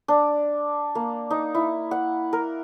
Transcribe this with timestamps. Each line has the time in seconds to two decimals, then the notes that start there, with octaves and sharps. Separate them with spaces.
0.08 D4
0.95 A#3
1.31 D#4
1.55 E4
1.91 F#5
2.33 A#4